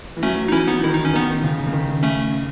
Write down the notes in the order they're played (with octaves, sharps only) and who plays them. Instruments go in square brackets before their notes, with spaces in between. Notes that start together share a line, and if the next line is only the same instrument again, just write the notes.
[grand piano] E3
[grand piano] F#3 [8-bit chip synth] A3 C#4
[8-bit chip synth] D#4
[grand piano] E3 [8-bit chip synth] C#4 E4
[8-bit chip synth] B3 D#4
[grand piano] D#3 [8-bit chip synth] E4
[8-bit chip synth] D#4
C#4
[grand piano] D#3 [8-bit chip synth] B3 D#4
[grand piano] C#3
C#3
D#3
[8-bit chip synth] A3 C#4